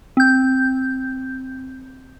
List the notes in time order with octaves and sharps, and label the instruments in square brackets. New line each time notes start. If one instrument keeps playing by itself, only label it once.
[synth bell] C4 G6